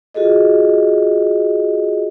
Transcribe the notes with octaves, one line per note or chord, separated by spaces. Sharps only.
F4 F#4 G#4 A4 D#5